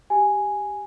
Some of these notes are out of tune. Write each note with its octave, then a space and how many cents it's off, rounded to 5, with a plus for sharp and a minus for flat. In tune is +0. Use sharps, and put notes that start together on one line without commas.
G4 +0 G#5 +0